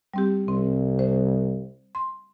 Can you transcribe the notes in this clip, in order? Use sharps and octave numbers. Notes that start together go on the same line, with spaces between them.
G3 C4 G4
C2 C4
C5
C6